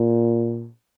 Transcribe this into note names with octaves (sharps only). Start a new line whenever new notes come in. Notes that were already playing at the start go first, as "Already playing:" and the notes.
Already playing: A#2